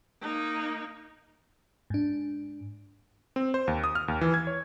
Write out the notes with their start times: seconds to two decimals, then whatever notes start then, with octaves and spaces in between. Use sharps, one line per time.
0.21 A#3 D#4
1.90 G#2 D4
3.36 C4
3.54 C5
3.68 D#2
3.84 D#6
3.95 F6
4.08 D#2
4.21 E3
4.34 G#6
4.47 C#5